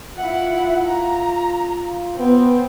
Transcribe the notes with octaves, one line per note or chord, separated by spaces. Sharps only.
E4 F4 F#5
A#5
B3 C4